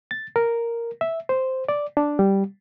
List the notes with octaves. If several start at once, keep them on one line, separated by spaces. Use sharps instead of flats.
A6
A#4
E5
C5
D5
D4
G3